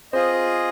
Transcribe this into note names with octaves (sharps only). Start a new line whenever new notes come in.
C4 F4 G#4 C5 D#5